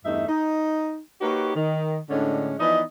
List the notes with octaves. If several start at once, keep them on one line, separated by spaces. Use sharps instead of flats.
E2 G2 A3 D#4 E5
D#4
A#3 D#4 F#4 G4 B4 C#5
D#3
A2 D3 G#3 C#4 D4
E3 F3 B3 D#4 D5 D#5